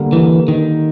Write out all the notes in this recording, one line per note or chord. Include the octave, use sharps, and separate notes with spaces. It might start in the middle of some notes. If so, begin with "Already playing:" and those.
Already playing: D3 G3 A#3
E3
D#3